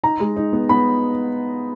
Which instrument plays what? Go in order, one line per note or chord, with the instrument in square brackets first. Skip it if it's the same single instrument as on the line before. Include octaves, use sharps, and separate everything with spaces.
[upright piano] D#4 A#5
G#3
D#4
B3
B3 B5